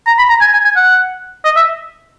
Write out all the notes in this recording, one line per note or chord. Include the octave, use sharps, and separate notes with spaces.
A#5
B5
A#5
G#5
G#5
G#5
F#5
D#5
E5